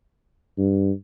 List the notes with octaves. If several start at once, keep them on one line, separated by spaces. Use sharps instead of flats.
G2